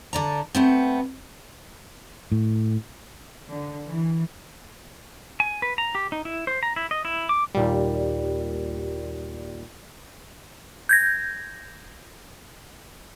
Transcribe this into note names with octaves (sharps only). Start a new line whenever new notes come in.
D3 D5 A#5
A3 B3 C4
A2
D3
E3
G#5
B4
A#5
G4
D#4
E4
C5
A#5
E4
D#5
E4
D6
D#2 A#2 G3
G6 G#6 A#6